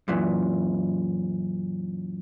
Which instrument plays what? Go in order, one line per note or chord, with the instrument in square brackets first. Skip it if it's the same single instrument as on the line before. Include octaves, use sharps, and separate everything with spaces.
[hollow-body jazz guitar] F#2 A#2 E3